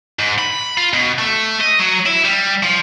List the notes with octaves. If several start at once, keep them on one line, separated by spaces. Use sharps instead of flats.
G#2
B5
F4
B2
A3
D#5
F#3
E4
G3
F3